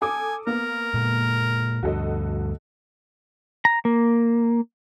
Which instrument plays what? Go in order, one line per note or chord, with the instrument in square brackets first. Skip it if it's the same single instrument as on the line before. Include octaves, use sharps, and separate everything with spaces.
[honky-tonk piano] A4 D6 D#6 [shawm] G#5
[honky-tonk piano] A#3 B3 [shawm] A#4
[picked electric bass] A#2 G#3
[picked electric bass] D2 G2 [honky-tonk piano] F#4 A4 D#5
[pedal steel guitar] A#5
A#3